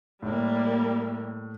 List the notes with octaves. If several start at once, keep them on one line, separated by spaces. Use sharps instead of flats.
A2 G3 A#3